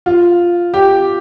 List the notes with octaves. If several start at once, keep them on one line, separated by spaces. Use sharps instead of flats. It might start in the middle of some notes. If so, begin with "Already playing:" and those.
F4
G4